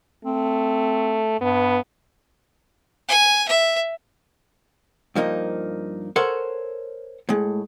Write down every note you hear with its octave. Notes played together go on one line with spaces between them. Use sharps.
A3 C4
G2 B3
G#5
E5
G2 F3 A#3 D#4
A4 A#4 C5 C#5 F#5
A2 G#3